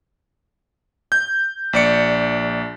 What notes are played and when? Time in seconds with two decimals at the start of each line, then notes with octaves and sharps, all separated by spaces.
1.12 G6
1.73 A#1 D5 C#7